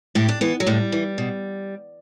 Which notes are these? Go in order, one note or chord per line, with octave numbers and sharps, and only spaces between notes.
A2 G4
D4
E3 B3
F#3
A2 G3
E3
B2